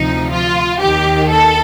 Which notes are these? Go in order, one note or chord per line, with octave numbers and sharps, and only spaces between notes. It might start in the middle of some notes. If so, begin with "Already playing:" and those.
Already playing: D2 C3 F3 D#4
F4
D#2 D#3 G4
A4